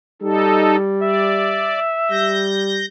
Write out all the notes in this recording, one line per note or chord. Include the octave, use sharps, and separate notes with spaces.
G3 D#4 A4
D5 E5
G3 G6 A#6